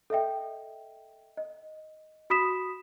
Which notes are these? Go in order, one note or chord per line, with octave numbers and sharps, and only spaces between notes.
A4 D#5 E5 G5
D#5
F#4 B5 D#6 B6 E7